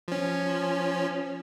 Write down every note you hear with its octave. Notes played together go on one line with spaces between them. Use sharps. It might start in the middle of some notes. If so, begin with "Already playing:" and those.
F3 C#4